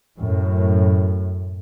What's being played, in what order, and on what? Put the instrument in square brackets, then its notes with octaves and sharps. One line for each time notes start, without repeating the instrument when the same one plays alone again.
[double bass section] F#2 A2